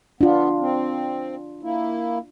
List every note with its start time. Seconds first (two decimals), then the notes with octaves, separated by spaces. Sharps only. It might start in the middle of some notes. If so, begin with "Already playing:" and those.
0.21 B3 D4 F4
0.60 C4
1.63 A#3 E4